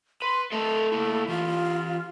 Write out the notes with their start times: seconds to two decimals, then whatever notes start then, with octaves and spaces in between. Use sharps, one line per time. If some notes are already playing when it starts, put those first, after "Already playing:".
0.22 B4 C6
0.52 A3 A4 D#5 E5
0.92 A#3 E4
1.28 E3 F4 G4